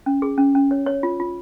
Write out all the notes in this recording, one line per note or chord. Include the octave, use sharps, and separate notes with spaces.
C#4
G#4
C#4
C#4
C#5
C#5
F4
F4